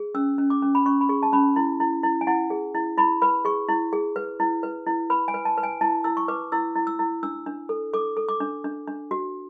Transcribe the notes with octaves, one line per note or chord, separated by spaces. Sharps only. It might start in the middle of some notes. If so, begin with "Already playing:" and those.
Already playing: G#4
C#4 E6
C#4
D6
C#4
B5
C#4 C#6
B5
G#4 C#6
A5
C#4 B5
E4
E4
E4
G#5
E4 F#5
G#4
E4
E4 B5
B4 B5
G#4 C#6
E4
G#4
B4
E4
B4
E4
B4 B5
G#5
B4
A5
B4
G#5
E4 A5
E4 E6
C#6
B4 D6
E4 E6
E4
E6
E4
D4 E6
D4
A4
A4 D6
A4
D6
D4
D4
D4
F#4